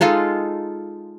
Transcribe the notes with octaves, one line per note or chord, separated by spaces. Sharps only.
G#3 D#4 F4 A4